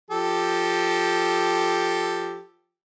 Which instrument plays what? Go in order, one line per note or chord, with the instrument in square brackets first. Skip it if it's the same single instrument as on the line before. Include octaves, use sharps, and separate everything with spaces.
[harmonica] F3 G4 A4